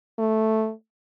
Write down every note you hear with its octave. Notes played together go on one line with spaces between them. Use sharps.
A3